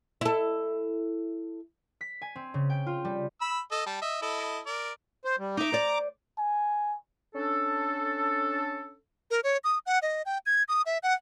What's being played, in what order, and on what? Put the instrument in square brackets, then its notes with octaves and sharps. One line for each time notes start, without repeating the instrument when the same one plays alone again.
[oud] E4 A4
[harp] B6
G#5
C4
C#3
G5
F4
G3
[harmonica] B5 E6
A4 D#5
G3 A5
D#5 E5
E4 A4 D#5
A#4 D5
[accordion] C5
G3
[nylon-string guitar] D#4 E5 [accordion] A#5 D6
[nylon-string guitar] C5 D5
[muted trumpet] G#5
[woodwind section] C#4 D4 A4
[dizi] A#4
C#5
D#6
F#5
D#5
G5
G#6
D#6
E5
F#5